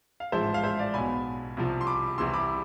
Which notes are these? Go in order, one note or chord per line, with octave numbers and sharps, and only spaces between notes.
F5
A1 G#2 F3 C5 E5
F5
C5 E5
D5 F5
B1 B2 G#5 B5
C2 C3 F3
C6
B5 D6
C2 C3 E3 C6 E6
B5 D6